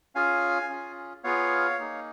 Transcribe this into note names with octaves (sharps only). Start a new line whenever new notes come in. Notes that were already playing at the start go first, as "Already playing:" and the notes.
C#4 F4 G#4 F5 G#5
C#4 F4 G#4
B3 F4 G#4 C#5 F5
A#3 D#4 G#4